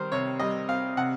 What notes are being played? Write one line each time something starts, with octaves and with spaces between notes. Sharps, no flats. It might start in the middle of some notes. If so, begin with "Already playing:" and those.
Already playing: D#3 G3 A#4 C5
C3 C#5
G3 D#5
C4 F5
C3 F#5